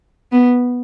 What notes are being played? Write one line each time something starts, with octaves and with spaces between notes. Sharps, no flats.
B3